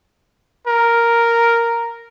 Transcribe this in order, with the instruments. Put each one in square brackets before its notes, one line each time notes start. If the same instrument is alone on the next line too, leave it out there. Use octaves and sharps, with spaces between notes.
[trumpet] A#4